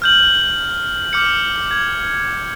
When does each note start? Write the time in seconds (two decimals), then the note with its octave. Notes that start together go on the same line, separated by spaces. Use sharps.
0.02 F6 G6 F#7
1.13 D6 F6 G6 C#7
1.71 G#6